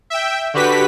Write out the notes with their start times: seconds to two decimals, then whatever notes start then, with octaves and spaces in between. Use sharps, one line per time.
0.10 E5 G5
0.54 D3 F#4 G4 B4 B6